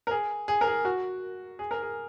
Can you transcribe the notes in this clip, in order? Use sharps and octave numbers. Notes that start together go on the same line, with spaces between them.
A#4
G#4
G#4
A#4
G#4
F#4
G#4
A#4
G#4